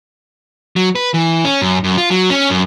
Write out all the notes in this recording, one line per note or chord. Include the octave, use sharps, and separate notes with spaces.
F#3
B4
E3
C#4
F#2
F#2
F4
F#3
C#4
F#2